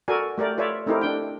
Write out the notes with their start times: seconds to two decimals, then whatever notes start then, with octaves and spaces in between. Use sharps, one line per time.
0.08 F#4 A4 A#4 D5 G#5
0.38 A3 G4 A#4 D5
0.58 F4 B4 C#5 D5 E5
0.86 A3 C4 D#4 E4 G4 A#4
1.01 D4 G5